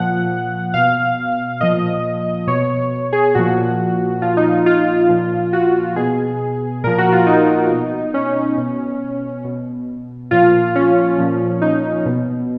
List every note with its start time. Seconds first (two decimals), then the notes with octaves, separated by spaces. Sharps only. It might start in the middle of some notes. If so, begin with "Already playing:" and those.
Already playing: A#2 F3 F#5
0.74 B2 F5
1.61 A#2 F3 D#5
2.47 B2 C#5
3.13 G#4
3.35 A#2 F3 F#4
4.22 A#2 F3 F4
4.37 D#4
4.51 D#4
4.66 F4
5.09 A#2 F3
5.53 F#4
5.96 B2 G#4
6.84 A#2 F3 A#4
6.98 F#4
7.12 F4
7.26 D#4
7.70 B2
8.14 C#4
8.57 B2
9.44 B2
10.31 A#2 F3 F4
10.75 C#4
11.19 A#2 F3
11.62 D#4
12.06 B2